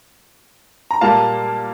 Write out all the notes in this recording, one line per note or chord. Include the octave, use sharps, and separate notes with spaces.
A#5
A#2 G3 A#3 F5 A5